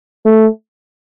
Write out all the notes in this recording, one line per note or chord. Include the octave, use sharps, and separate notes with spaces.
A3